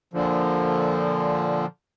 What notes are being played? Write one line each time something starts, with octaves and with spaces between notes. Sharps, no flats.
A#2 D3 F3